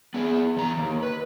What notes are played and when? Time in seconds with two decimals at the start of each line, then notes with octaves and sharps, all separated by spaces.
0.14 B3 G#4
0.57 E2 A#5
0.77 D#2
1.03 B4